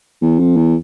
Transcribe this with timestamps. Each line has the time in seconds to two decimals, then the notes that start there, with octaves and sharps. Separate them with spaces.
0.21 E2
0.39 F2
0.56 E2